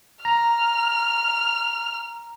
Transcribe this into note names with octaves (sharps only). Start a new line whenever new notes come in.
A#5 F6